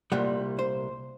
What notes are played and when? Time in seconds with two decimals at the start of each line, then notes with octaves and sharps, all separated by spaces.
0.12 C2 A#2 G3 F#5
0.59 C5